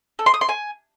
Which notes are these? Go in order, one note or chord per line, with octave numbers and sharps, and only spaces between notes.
A4
C6
D#6
C6
G#5